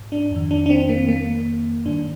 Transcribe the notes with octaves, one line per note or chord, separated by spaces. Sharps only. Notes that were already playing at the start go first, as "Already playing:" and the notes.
Already playing: G#2
D4
F2 D#3
D4
D4
C4
A#3
A#3
G2 D#3 D4